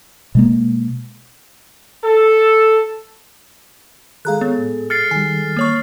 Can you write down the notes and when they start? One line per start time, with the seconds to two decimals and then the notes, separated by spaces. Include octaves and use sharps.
0.35 B2 G#3 A#3
2.04 A4
4.25 D#3 G#3 G#4 A4 F5 A#5 F#6
4.41 B3 C#5
4.58 A2
4.90 F6 A6 C7 C#7
5.11 D#3 G3 G#5
5.57 A#3 C#5 C#6